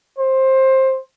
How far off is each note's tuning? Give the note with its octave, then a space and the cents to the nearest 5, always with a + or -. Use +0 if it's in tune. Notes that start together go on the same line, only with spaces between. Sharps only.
C5 +15